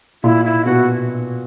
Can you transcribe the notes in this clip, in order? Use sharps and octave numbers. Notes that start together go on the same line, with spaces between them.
A#2 E4
E4
B2 F#4